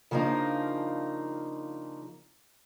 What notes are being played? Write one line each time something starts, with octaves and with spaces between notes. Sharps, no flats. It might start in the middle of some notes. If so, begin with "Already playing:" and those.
C#3 F3 A#3 D4 D#4